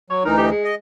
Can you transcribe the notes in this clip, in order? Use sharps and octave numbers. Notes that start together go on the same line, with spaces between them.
F#3 C#5
D2 E3 D#4 A#4
G4
G#3
D#5